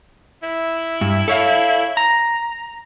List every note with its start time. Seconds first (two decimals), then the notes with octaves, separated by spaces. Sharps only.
0.43 E4
1.01 G2
1.28 A4 C#5 F5
1.97 A#5